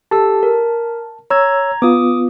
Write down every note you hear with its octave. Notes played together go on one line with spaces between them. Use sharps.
G4 A4 A5 E6
A#4
C#5 A#5 E6 G#6
B3 F4 D6 D#6